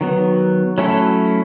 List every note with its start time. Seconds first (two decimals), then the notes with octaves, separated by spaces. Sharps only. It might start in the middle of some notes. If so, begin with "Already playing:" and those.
0.01 D#3 F#3 B3
0.78 F#3 A3 C#4 E4 A4